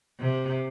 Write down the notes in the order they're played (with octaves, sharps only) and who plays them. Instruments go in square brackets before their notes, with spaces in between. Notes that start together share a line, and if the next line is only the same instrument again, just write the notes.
[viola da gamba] C3